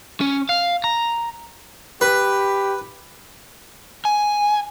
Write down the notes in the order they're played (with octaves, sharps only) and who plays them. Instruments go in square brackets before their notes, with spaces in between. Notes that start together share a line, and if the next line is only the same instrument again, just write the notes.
[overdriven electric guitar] C#4
F5
A#5
[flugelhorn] G4 [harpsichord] B4
[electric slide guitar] G#5